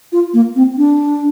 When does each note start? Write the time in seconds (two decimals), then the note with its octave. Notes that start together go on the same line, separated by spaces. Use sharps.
0.12 F4
0.33 A#3
0.56 C4
0.77 D4